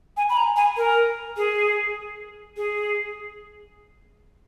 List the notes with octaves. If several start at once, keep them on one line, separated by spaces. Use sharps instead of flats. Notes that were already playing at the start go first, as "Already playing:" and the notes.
G#5
B5
A#5
G#5
A#4
G#4
G#4